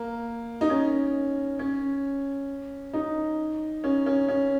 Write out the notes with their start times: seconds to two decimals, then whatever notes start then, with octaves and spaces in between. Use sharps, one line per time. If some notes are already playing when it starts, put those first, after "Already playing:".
Already playing: A#3
0.61 D#4
0.70 C#4
1.59 C#4
2.93 D#4
3.84 C#4
4.06 C#4
4.29 C#4